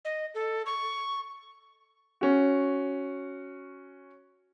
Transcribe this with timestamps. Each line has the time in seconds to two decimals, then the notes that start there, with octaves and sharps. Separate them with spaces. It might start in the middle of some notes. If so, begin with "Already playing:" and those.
0.05 D#5
0.35 A4
0.66 C#6
2.21 C#4 F#4